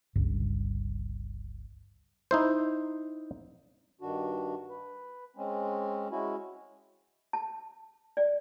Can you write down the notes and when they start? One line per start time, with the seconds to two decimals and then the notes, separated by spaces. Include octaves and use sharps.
0.16 G1 C#2 G2
2.31 D#4 E4 C5
4.01 G2 D#3 D4 F#4
4.69 B4
5.36 G#3 C4 C#4
6.11 G#3 C#4 E4 F#4
7.33 A5
8.17 D5